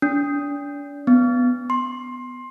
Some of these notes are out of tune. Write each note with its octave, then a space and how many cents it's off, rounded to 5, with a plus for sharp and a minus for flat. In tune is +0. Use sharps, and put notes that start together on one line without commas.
D4 -35
B3 +10
C6 +20